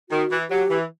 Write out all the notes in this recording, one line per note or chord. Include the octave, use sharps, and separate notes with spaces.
D#3 F#4
E3
F#3 G4
E3